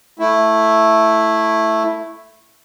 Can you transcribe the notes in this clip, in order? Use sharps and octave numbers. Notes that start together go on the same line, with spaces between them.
A3 E4